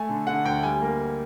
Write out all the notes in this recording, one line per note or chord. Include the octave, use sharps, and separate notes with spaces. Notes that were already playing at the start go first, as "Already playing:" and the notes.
Already playing: A3 G#5
D3
D3 F#5
D2 G5
G3 G#5
A#3